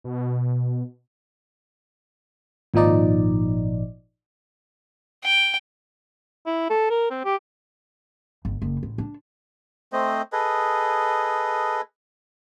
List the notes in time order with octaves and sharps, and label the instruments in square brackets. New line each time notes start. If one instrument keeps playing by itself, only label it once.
[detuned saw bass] B2
[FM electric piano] G#1 A#2 F3 D#4 D5
[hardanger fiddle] G5
[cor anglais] E4
A4
A#4
C4
G4
[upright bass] G1
F#1
A1
D4
[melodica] A3 C4 C5 D#5
G#4 A4 B4 D#5